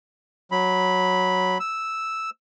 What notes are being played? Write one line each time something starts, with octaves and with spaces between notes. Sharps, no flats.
F#3 B5
E6